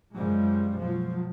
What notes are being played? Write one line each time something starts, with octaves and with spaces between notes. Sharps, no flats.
F#2 C#3 F3 G3 G#3
B2 F3 F#3